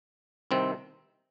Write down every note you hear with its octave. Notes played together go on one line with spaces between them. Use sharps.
C2 C3 D#3 C4